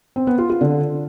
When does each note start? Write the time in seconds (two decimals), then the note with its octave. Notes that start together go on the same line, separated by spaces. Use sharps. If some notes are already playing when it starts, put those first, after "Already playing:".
0.16 C4
0.27 B3
0.38 F4
0.50 F4
0.61 D3